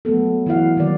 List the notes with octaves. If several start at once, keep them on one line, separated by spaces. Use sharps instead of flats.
F#3 A3 B3 A4
E3 E4 F#4 F5 F#5
D#3 F#3 A#3 D5